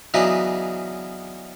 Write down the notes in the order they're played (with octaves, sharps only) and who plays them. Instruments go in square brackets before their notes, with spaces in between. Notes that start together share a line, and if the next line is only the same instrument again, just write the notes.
[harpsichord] C#3 E3 F#3 B3 D4 D#4